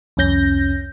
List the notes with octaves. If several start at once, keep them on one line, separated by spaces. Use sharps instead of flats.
C2 F2 C#4 G6 A#6